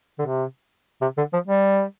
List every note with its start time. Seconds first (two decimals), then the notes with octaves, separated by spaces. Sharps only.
0.19 D3
0.26 C3
1.02 C3
1.18 D3
1.33 F3
1.47 G3